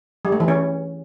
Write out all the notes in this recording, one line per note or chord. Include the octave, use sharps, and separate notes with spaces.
G3
A3
E3
C#4